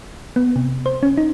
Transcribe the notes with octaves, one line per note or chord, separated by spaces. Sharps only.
B3
C3
C5
C#4
D#4